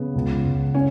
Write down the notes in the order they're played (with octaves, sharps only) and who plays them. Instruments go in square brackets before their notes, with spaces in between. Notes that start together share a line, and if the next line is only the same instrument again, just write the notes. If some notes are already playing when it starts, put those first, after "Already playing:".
Already playing: [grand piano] C#3 [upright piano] B3
[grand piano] C#2
C#2
[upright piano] C#4